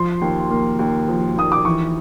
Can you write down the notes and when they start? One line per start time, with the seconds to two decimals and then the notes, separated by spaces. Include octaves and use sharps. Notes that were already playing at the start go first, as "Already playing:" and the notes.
Already playing: F3 C6
0.21 D#2
0.50 A#3
0.79 D#2
1.08 F3
1.37 D#2 D#6
1.52 D6
1.65 E3 C#6